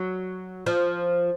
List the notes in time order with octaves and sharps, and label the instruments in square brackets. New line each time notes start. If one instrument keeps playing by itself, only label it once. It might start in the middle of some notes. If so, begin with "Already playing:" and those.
Already playing: [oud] F#3
F3